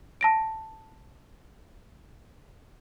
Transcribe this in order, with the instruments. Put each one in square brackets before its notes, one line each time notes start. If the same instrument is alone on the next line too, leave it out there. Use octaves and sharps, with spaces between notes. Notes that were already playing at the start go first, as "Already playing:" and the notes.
[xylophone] A5 A#6 D7